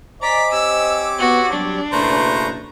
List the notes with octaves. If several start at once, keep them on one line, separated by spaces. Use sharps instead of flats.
C5 D5 D#5 G#5 A#5 D6 B6
C4 G4 C#5 E6
B3 F#4
F#3 G3 D4
F#1 B2 A3 A#3 B4 C5 A#5 C#6